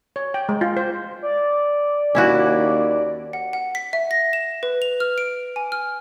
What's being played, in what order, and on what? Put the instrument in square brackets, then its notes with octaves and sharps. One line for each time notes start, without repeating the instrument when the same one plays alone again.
[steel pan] C#5
G5
G#3
F4
C5
[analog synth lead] D5
[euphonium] D#2 [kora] C#4 E4 F#4
[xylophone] F#5
F#5
B6
E5
A#6
E7
B4
F7
F6
D7
G#5
F6